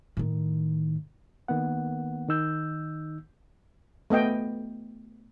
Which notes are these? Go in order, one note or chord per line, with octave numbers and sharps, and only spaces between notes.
A2 D#3
D#3 A#3 B3 F#5
D#3 D#4 E6 G6
A3 B3 D#5 G5